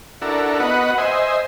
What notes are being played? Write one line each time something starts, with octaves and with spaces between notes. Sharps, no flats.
D4 E4 F#4 A4 A#4
B3 F#4 B4 D#5 F#5
C5 D#5 E5 G#5